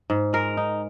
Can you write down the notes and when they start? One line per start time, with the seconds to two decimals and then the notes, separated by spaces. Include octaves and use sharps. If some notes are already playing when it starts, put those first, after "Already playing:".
0.10 G#2
0.33 G#3 A#4
0.57 D#4